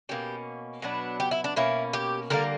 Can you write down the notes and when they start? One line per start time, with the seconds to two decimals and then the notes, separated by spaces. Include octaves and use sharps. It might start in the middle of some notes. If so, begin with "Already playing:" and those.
0.09 B2 A#3 C#4 G4
0.82 B2 F#3 B3 D4
1.20 G4
1.31 E4
1.44 D4
1.56 B2 A#3 C#4 E4
1.93 G4
2.30 D3 G3 A#3 A#4